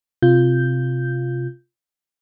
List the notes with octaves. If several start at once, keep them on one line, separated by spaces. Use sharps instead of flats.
C3 F4 G6